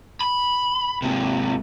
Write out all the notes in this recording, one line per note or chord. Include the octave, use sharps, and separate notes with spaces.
B5
G#2 C3